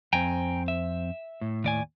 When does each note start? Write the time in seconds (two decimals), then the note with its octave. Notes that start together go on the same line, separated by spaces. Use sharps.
0.13 F2 C4 G5 G#5 A#5
0.68 E5
1.41 A2
1.64 D#2 D5 G#5